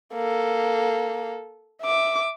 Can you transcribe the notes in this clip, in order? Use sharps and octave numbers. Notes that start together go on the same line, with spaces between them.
A#3 A4
E5 D6